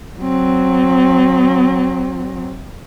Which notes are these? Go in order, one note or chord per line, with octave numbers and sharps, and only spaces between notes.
F#3 C4